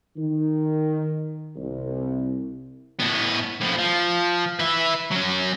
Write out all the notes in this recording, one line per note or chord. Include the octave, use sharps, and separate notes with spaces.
D#3
C2
A2 B3
A2 F3
F3
B4 E5
F#3 C#4